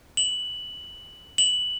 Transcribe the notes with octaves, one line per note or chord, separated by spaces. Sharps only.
F#7
F#7